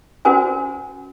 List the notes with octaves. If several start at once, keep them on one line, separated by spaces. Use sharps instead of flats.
C#4 F#4 A#4 C5 G#5